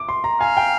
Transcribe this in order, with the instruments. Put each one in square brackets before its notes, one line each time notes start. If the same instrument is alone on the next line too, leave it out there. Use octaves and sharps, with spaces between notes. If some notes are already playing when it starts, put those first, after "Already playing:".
Already playing: [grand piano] D6
C6
A#5
[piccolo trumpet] F5 [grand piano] G#5
[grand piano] G5